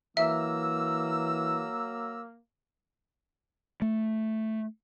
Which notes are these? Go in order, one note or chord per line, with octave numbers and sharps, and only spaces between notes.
E3 F#3 A#3 E5 A#5 E6
A3